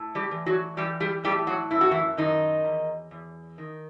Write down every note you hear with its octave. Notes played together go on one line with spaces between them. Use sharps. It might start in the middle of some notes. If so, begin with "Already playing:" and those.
Already playing: A2
G3 G4
E3
F#3 F#4
E3 G3 G4
G3 G4
A2 G3 G4
F#3 F#4
F#2 E4
F#4
E3 E4
F#2 D#3 D#4
E2
E2
D#3